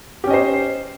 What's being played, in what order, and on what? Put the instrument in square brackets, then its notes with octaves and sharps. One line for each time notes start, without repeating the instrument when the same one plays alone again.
[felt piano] G4
C#4
D#5
C5